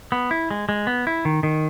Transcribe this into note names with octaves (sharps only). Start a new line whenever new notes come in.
B3
E4
G#3
G#3
B3
E4
D#3
D#3